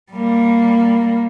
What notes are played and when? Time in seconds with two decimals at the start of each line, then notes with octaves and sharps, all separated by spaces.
0.12 G3 A#3